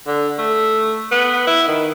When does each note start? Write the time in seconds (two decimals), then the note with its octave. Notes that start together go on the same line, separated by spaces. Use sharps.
0.07 D3
0.38 A3
1.12 B3
1.47 E4
1.68 D#3